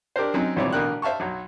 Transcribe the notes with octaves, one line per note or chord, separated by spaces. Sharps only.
D4 G4 A#4 C5
F#3 C4 C#4 D#4
G#1 A#2 E3 G3 C4 C#5
A1 B2 D3 A#4 G5 F#6
C5 E5 F5 A5 C#6
B1 F#3